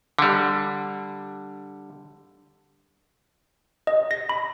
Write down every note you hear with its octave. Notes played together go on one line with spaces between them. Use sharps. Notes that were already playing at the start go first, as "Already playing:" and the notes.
D3 G3
D#5
A#6
B5